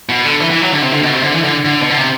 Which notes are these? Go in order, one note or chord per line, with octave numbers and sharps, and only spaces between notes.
B2
D3
E3
E3
F#3
D3
C3
D3
B2
C3
D3
E3
D3
D3
B2
D3
C3